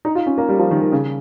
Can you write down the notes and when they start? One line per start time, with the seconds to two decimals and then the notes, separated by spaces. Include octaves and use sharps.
0.05 D#4
0.15 F4
0.26 C#4
0.38 A#3
0.49 G3
0.59 F3
0.71 D#3
0.81 D#3
0.92 C#3